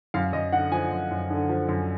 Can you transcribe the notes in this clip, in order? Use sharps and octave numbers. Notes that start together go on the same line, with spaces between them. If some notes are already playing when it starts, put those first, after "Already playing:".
F#2 F5
F#2 D#5
D3 F#5
F3 G#5
F#2
F#2
D3
F3
F#2